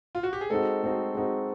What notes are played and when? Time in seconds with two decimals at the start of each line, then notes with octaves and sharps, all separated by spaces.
0.15 F4
0.23 F#4
0.33 G4
0.41 G#4
0.50 G#3 C4 D#4 F#4 A4
0.83 G#3 C4 D#4 F#4
1.15 G#3 C4 D#4 F#4